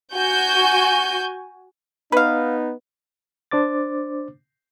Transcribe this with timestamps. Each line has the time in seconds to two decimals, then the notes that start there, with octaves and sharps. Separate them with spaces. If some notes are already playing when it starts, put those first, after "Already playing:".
0.14 F#4 G#5 G6
2.12 B3 D#4 B4 F5
3.51 D4 C5 D6 A6